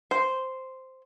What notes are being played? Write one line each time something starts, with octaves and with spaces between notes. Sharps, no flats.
C5